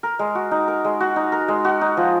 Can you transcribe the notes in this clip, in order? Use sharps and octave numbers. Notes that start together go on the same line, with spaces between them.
A#4
G#3
F#4
D#4
A#4
G#3
F#4
D#4
A#4
G#3
F#4
D#4
F3